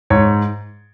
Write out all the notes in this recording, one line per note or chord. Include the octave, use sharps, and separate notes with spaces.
G#2 C#5